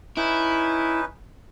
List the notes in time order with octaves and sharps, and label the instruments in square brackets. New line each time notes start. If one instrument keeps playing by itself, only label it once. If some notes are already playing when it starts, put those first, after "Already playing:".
[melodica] C#4 D#4 B4 [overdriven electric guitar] E4